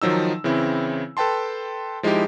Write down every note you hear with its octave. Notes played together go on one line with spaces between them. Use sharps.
D#3 F3 F#3 D#4 E6
C#3 E3 C4 E4
A4 B4 G5 A5 C6
F3 G#3 D#4 E4 G4